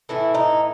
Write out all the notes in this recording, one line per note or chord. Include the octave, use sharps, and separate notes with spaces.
A2 E3 A3 E4
D#4